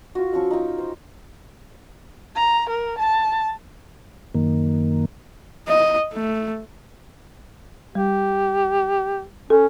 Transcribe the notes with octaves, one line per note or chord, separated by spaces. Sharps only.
F4 F#4
F3 C#4 C#6 E6
D#4 F4 G5
C5
A#5
A#4
A5
F#2 D#3 A#3
D#5
A3
G3 G4
C#4 A4